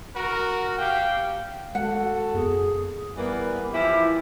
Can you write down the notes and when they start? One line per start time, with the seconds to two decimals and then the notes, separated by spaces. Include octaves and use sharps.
0.16 F#4 A#4
0.79 G4 F5 G5
1.75 G#3 F#4 A4 F#5
2.34 F#2 B3 G#4
3.17 E3 G3 A#3 B3
3.73 E3 F3 E4 F4 G4